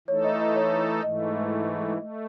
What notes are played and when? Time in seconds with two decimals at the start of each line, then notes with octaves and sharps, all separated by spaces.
0.08 E3 A3 D#4 A4 C#5
0.24 D#5
0.40 D#5
0.56 C#5
1.03 G#2 E3 A3 D#5
1.97 A3